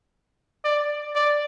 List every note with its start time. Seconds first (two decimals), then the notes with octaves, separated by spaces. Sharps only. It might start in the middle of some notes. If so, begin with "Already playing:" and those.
0.64 D5
1.15 D5